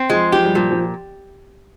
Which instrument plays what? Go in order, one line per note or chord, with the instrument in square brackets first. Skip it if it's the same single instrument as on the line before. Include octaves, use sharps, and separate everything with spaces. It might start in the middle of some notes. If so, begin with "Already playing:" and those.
Already playing: [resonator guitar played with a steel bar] C4
[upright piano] F3 [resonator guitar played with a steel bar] G#3
[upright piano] F3 [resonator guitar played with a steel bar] G4
[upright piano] G3
[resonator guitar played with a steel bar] A#2 [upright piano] F3
[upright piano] F3